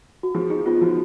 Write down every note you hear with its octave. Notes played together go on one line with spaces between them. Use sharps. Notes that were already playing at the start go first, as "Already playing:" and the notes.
F#4
F3 G#4
D#4 G#4
B3 F4
F3 F#4